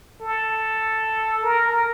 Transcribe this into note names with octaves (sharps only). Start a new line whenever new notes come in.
A4
A#4